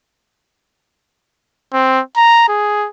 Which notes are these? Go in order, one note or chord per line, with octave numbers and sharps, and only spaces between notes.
C4
A#5
G#4